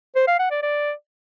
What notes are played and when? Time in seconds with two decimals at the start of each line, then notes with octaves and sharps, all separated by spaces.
0.16 C5
0.27 F5
0.39 F#5
0.51 D5
0.63 D5